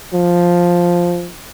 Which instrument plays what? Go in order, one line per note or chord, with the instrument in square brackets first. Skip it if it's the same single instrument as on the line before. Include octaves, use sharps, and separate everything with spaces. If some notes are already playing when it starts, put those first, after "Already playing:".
[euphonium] F3